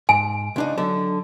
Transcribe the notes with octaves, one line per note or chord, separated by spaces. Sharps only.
G#2 G#5
C#2 D4 D#4
D3 F#3 A5